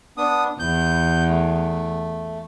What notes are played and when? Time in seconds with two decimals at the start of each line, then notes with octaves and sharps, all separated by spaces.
0.17 B3 D4 D#6
0.59 E2 G6
1.29 A3